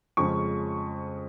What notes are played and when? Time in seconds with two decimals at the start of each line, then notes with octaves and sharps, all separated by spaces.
0.17 F2 C#3 F3 G#3 C#4 C#6